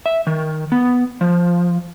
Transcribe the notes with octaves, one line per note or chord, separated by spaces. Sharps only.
E5
D#3
B3
F3